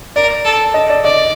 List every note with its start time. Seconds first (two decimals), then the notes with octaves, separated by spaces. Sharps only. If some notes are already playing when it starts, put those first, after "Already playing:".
0.16 A#4 D5
0.45 A4
0.74 D#5
0.90 D5
1.04 D5 D#5